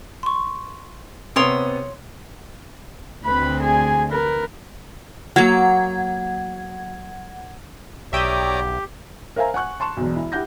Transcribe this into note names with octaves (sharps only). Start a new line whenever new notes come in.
C6 C#6
C3 B3 C#5 C6 D#6 D7
D2 C4 B4 B5
G#4 G#5
A#4 B4
F#3 A#3 F#5 G#6
B1 G4 C#5 D5 E5 G5 A#5 D#6
A#4 C5 E5 F5 G#5 A#5
F#5 G#5 C#6 F#6
A5 C6 C#6 E7
E1 B1
E4
E4 G4 F#5 G6 A#6